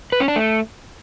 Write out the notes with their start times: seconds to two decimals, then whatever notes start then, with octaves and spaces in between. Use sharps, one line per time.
0.12 B4
0.20 C#4
0.28 D4
0.36 A3